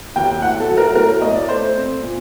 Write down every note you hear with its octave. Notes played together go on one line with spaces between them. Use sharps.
D#2 G5
A2 F#5
A4
F#3
A#4
A2 A#4
A2 D#5
D5
A3 C5
C4
A#2